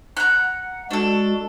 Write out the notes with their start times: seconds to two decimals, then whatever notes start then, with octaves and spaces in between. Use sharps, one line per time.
0.17 F#5 A#5 F#6
0.91 G#3 D4 F#4 A4